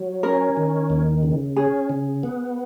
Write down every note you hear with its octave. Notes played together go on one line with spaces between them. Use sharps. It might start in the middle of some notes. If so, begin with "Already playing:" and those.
Already playing: F#3
C#4 A#4
D#3
D#2
C#3
C#4 G#4
C#3
B3